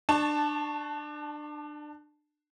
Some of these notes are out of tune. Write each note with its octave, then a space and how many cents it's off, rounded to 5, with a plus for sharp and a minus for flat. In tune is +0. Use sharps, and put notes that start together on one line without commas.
D4 +25 A5 -5 C#6 +0